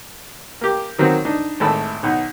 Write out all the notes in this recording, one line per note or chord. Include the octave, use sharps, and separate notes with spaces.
A#3 G4
D#3 F#3 A#3 C4 F#4
D4 D#4
G#1 A2 A3 A5 B5
B1 D#4 F#5